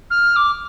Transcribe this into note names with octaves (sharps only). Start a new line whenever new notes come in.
F6
D6